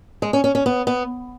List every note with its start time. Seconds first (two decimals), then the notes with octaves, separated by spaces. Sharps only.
0.22 G#3
0.33 C#4
0.44 C#4
0.55 C#4
0.66 B3
0.87 B3